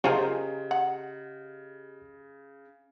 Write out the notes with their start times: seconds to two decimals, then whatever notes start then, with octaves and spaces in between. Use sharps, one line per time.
0.04 C#3 C#4 F4 G4 G#4 A#4 C5 D#5
0.71 F#5